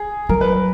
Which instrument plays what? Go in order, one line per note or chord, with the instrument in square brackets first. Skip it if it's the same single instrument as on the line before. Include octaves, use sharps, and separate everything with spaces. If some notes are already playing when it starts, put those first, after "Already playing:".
Already playing: [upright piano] G#4
[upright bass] F#3 [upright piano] A#4
[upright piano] B4
B4